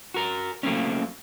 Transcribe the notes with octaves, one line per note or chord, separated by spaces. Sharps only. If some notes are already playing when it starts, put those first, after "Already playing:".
F#4 A#4
F#3 A3 A#3 C4 C#4